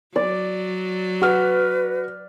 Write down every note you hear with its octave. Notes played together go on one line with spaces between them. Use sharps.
F#3 D5
F#4 B4 F6